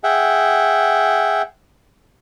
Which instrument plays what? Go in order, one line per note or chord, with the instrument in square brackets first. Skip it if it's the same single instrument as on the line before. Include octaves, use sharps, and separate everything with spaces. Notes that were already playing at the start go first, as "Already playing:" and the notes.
[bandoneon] G#4 E5 F#5 G5